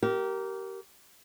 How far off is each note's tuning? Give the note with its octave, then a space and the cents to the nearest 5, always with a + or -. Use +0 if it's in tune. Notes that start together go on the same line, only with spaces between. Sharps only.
G4 -25 A#4 +0